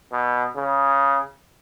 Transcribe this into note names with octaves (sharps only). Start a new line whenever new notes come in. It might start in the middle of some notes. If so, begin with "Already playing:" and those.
B2
C#3